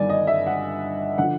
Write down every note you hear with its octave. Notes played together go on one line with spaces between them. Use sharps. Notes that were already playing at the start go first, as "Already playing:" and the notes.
Already playing: G1 G2 D#3 D5 G#5
D#5
E5
F#5
D3 F3 F#5